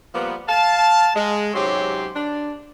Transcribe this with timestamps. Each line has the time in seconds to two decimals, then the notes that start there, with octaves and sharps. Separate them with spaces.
0.15 F3 G3 A#3 B3
0.49 F5 A5
1.16 G#3
1.54 G#2 C3 F#3 C#4 G4 C6
2.16 D4